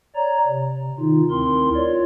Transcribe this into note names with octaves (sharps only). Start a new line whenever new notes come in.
C#5 D5 A#5
C3
D#3 D#4 F4
D2 C4 E4 A#4 C6
F4 C#5 D5